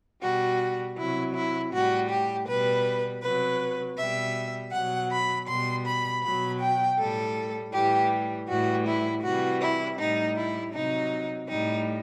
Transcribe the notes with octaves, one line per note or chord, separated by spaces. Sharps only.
B2 G3 F#4
C3 F#3 E4
E4
A2 G3 F#4
G4
B2 G3 B4
C3 F#3 B4
B2 G3 E5
B2 F#3 F#5
B5
B2 G3 C6
B5
B2 F#3 B5
G5
A2 G3 A4
A2 E3 G3 G4
A2 E3 G3 F#4
E4
C3 E3 G3 F#4
E4
A2 G3 D#4
E4
C3 F#3 D#4
A2 G3 D#4